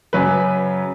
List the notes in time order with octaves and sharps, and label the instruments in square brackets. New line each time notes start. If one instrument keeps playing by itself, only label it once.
[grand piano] F#2 C#3 F#3 B4